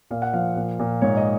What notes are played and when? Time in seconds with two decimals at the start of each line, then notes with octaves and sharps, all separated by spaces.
0.11 A#2 F5
0.22 F#5
0.33 F3 F5
0.56 A#2
0.79 A#2
1.02 G#2 C#5
1.17 D#5